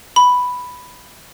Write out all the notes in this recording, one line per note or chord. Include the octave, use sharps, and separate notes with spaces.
B5